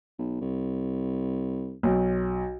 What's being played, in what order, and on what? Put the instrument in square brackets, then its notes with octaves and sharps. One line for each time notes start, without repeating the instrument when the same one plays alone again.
[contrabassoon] B1
C2
[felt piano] B1